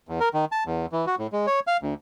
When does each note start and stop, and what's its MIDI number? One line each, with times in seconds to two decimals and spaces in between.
0.09 0.19 40
0.20 0.29 70
0.34 0.45 51
0.52 0.64 81
0.66 0.86 40
0.92 1.05 52
1.07 1.15 66
1.19 1.27 45
1.32 1.46 56
1.47 1.60 73
1.67 1.77 77
1.82 1.94 38